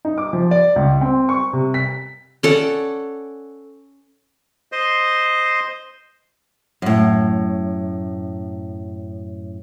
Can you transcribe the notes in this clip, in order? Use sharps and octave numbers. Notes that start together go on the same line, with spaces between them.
D#4
D6
F3
D5
C#2
C4
C#6
C3
B6
C#4 A4 D5 F#5
C5 D#5 C6
F#2 A2